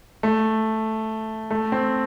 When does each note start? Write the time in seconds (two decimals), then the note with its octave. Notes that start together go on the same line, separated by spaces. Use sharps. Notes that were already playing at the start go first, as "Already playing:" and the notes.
0.23 A3
1.51 A3
1.72 C4